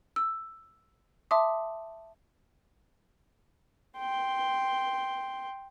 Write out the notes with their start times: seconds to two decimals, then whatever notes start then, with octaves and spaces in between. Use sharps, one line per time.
0.16 E6
1.31 E5 A5 C6 D6 D#6
3.98 G5 C6